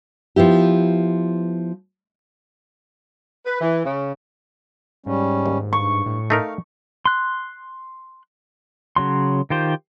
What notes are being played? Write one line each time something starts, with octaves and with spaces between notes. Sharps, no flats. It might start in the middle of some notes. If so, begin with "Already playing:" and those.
F3 B3 E4 G4
B4
E3
C#3
G#2 G3 C#4
D#2
G2 C#6
A2
A3 D#4 A#4 F5
C6 F#6
C#3 F#3 C6
D#3 F4 G4 C5